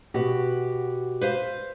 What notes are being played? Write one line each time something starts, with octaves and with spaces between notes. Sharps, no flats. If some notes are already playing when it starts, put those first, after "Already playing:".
B2 F#4 G4
B4 C5 F5